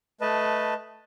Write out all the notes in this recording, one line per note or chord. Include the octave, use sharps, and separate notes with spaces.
A3 B4 D#5 A5